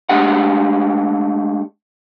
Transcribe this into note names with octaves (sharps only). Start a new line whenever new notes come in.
G#3 A3 D4 G4 F#5